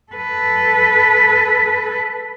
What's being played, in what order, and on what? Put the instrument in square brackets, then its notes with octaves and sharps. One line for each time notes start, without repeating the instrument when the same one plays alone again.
[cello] A4 B4